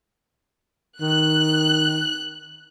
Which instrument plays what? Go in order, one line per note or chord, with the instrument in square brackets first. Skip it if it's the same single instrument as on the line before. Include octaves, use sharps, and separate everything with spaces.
[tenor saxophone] D#3 [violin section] F#6